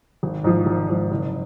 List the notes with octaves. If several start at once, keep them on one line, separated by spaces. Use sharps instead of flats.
G#1
G#2 F3
G#1
G#2 F3
F#1